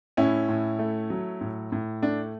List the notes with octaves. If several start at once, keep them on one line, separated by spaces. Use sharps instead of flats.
A2 C#4 E4
A2
A3
F#3
A2
A2
A3 D4